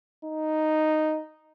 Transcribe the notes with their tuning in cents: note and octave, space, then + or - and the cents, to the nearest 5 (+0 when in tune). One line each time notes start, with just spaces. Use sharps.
D#4 -5